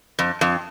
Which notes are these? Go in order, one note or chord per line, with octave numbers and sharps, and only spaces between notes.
F2
F2